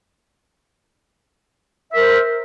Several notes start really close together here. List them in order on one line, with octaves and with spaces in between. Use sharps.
E5 A#4 C5